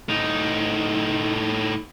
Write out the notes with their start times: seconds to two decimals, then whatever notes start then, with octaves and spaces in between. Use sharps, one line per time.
0.09 A2 D#4